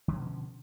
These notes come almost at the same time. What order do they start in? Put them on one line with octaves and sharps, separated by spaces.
D3 B2 F3 C#4